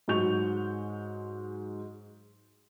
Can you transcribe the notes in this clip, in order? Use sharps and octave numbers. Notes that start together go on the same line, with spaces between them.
G#2 F#3 G#3 C#6 G6 F7